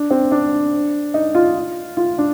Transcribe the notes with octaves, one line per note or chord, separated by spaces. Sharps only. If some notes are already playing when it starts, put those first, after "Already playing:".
Already playing: D4
C4
D4
D#4
F4
F4
D4